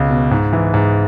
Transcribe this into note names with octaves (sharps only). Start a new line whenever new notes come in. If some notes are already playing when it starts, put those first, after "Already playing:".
Already playing: C#2 B2
B2
G#2
E3
G#2